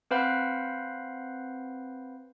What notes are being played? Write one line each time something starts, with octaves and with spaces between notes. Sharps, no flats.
C4 B4 C5 F5 F#5 B5